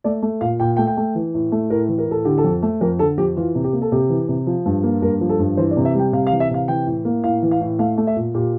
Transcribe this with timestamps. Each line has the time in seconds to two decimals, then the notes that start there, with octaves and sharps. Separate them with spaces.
0.04 A3 D5
0.22 A3
0.41 A#2 F5
0.60 A#2 G5
0.77 A3 G5
0.87 G5
0.97 A3
1.15 E3
1.34 A2
1.52 A3
1.70 A2 A#4
1.89 E3
1.98 A#4
2.07 A2 A4
2.25 D3 G4
2.38 A4
2.44 F2
2.62 A3
2.81 F2 A#4
2.99 D3 A4
3.18 F2 G4
3.37 E3 F4
3.55 C3
3.64 G4
3.73 A#3
3.82 A4
3.92 C3 G4
4.10 E3
4.28 C3
4.47 F3
4.66 G2
4.83 A#3
5.02 G2 A#4
5.21 F3
5.29 A4
5.39 G2
5.57 E3 C5
5.71 D5
5.77 C3
5.85 E5
5.95 G3 G5
6.13 C3 F5
6.27 F5
6.31 E3
6.40 E5
6.50 C3 F5
6.68 E3 G5
6.87 A2
7.05 A#3
7.24 A2 F5
7.43 E3
7.51 F5
7.60 A2
7.79 A3 F5
7.98 A3
8.07 E5
8.16 A#2
8.34 A#2 G4